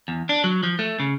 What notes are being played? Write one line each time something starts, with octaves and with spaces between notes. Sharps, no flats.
E2
D4
F#3
F3
A3
C#3